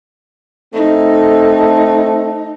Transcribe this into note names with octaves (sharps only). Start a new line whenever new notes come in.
A3 C4 D#4 A4